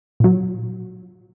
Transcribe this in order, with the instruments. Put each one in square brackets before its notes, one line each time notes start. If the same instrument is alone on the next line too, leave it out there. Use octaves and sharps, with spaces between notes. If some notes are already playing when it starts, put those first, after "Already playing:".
[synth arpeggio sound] A#2 F#3